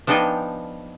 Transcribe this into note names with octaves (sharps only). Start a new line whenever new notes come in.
F3 B3 D4 D#4 G5 G#5